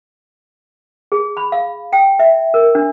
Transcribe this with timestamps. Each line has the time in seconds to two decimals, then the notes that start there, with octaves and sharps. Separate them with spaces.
1.12 G#4
1.37 B5
1.52 F5
1.93 G5
2.19 E5
2.54 A#4
2.75 D4